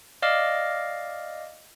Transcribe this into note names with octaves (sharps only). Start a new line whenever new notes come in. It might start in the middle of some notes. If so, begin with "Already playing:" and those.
D5 D#5 F5 D6 F6